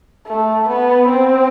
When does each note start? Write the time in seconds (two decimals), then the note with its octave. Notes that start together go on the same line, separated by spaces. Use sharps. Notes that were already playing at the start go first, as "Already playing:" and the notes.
0.27 A3
0.68 B3
1.09 C4